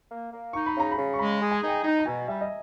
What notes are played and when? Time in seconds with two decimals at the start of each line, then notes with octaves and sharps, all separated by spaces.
0.10 A#3
0.32 A#3
0.53 D#4 C#6
0.66 B5
0.76 C#3 A#5
0.91 B5
0.97 C#3
1.14 C#6
1.19 G#3 B5
1.41 G#4
1.51 G#5
1.63 D#4 G5
1.84 D#4
1.99 A#5
2.06 B2 G#5
2.28 G3 E5
2.41 D#5